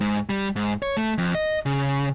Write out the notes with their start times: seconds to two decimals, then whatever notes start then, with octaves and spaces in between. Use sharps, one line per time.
0.01 G#2
0.29 G3
0.56 G#2
0.82 C#5
0.97 A3
1.18 F2
1.35 D#5
1.66 C#3